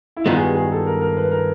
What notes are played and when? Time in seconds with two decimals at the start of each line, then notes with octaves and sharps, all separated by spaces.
0.17 E4
0.26 G2 D#3 G#3 B3 F4
0.37 G#4
0.41 G4
0.56 G#4
0.72 A4
0.87 A#4
1.01 A#4
1.17 B4
1.31 A#4